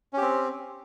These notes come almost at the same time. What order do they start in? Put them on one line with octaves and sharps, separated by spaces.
C#4 G4 C4